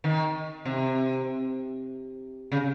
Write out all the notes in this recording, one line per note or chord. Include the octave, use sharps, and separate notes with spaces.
D#3
C3
C#3